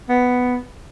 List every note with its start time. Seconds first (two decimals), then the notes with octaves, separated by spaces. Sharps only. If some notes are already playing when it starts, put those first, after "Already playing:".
0.09 B3